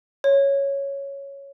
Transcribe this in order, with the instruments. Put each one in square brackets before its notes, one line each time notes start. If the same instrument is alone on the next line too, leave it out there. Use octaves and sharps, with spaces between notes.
[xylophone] C#5